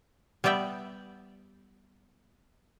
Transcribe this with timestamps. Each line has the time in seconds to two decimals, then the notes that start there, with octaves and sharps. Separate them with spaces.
0.44 G3 B3 D5 E5 G5